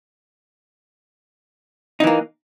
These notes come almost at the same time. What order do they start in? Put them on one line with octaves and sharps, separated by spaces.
D#4 E3 A#3